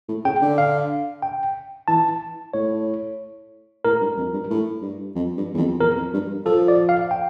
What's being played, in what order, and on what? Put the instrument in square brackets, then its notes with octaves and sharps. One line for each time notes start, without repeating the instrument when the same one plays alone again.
[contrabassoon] A2
[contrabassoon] C#3 [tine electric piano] G5
[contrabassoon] D3
[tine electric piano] F5
G5
[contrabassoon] E3 [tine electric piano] A5
[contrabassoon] A2 [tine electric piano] C#5
[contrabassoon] A2 [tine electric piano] A#4
[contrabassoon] G2
F2
G2
A2
G2
F2
G2
E2
F2
[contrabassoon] E2 [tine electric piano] A#4
[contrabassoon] F2
G2
[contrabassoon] F3 [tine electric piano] A4
[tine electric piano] D5
F5
G5